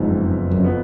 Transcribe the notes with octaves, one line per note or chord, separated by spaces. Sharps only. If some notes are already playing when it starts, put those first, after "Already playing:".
Already playing: F#1 F2 G#2 F3 B3
F#2
F3 B3